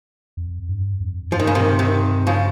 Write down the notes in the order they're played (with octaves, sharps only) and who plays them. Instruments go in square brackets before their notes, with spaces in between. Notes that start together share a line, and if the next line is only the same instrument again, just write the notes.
[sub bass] F2
G2
F2
[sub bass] G2 [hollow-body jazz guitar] F3
[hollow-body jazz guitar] D#3
C#3
C3 D#3
C3 D#3
C#3 F3